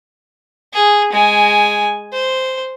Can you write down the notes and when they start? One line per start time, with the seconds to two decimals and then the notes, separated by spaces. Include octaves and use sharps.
0.74 G#4
1.13 G#3 G#5
2.13 C5